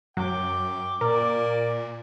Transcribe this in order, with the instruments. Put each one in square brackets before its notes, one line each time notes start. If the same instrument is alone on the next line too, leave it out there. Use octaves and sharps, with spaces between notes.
[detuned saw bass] F#2 [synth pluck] F#3 [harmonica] G5 [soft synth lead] D6
[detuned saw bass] A#2 [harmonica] A#3 D5 [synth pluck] A#4